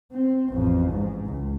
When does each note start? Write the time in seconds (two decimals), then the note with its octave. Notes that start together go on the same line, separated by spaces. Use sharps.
0.12 C4
0.49 A1 F2
0.91 G#2
1.27 C#2